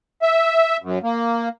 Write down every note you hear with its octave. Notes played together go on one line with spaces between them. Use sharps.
E5
F#2
A#3